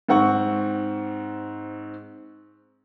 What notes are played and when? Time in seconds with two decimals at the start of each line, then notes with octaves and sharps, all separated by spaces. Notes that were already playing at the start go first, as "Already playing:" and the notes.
0.09 G#2 C4 F#5 C#6